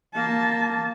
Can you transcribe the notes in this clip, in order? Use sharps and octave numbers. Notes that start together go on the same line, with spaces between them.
A#3 A5